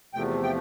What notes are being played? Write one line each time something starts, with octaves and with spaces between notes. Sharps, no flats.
E2 C3 F3 A3 G5
G5